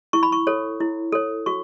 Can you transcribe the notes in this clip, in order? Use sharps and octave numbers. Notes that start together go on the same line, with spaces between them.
E4 C#6
B5
C#6
A4 C#5
E4
A4 C#5
F#4 C#6